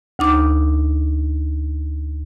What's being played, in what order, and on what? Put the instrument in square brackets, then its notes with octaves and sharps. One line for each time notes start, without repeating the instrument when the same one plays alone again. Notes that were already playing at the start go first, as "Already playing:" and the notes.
[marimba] D2 D#4 D6